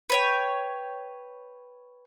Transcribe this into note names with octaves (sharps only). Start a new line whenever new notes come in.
B4 C#5 G5